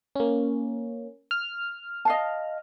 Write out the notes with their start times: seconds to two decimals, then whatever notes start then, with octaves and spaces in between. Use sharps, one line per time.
0.16 A#3 C#4
1.31 F6
2.05 D#5 F5 A5